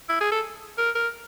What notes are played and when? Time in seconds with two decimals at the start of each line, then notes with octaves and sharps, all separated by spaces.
0.09 E4
0.21 G#4
0.32 A4
0.78 A#4
0.95 A#4